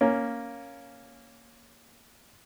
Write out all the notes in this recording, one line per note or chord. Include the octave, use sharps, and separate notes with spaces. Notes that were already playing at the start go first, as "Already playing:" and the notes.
A#3 C#4